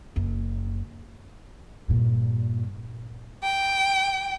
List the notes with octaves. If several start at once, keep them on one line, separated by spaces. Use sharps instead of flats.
F#1 F#2
G2 A#2
G5